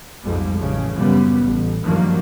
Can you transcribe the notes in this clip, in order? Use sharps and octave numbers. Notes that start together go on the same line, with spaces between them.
B1 F2 G#2 G3
A1 C#3
F#2 C#3 G3 B3
A1
G2 D#3 F3 F#3 A#3